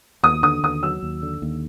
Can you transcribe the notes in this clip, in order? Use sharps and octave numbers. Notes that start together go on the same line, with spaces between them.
D#2 D#6
D3 D#6
D#2 D#6
F#3 E6
D#2
D3
D#2